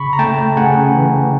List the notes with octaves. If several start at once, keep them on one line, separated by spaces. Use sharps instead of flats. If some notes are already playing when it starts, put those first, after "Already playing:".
Already playing: C#3 B5 C#6
A#5
A3 G5 A5
C#3 F#5 G#5
E3